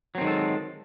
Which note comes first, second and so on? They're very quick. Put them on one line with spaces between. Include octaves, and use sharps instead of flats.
F#3 C4 D#3 G#3 A4